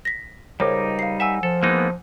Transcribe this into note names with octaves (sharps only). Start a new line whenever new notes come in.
A#6 B6
C#2 G3 D#4 A#4 C5 C#5 D6
F5 C7
E5 F#5 G#5 E6
F3 A4
E3 G#3 A#3 B3 D#4